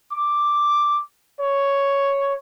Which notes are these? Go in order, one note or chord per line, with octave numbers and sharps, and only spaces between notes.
D6
C#5